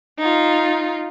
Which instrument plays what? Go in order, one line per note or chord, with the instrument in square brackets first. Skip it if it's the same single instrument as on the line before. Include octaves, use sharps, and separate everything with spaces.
[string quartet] D#4 F4